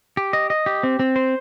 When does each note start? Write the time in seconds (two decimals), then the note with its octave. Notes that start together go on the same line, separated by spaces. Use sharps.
0.17 G4
0.33 D#5
0.50 D#5
0.66 G4
0.83 C4
0.99 C4
1.16 C5